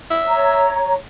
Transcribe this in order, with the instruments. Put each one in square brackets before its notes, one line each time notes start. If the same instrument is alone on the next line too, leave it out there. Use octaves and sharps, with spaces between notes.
[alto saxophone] E5
[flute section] C#5 A#5